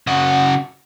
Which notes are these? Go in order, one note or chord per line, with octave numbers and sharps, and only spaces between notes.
C#3 F#4